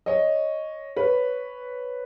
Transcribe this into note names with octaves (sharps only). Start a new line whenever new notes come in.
C#5 D#5
B4 C#5